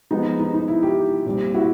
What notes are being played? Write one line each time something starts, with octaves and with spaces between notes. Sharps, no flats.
F3 G#3 B3 D#4
D#4
D#4
E4
F4 G4
A#2 G3 C4
E4 F#4